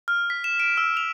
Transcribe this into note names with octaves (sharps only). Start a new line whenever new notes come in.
F6
B6
E7
D7
E6
F7